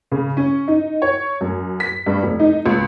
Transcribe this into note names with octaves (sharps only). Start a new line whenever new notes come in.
C#3
C#4
D#4
C#5
F#2
B6
G2
F1
D#4
C#2